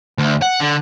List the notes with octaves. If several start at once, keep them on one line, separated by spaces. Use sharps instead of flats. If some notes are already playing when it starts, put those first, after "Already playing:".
D2
F#5
D3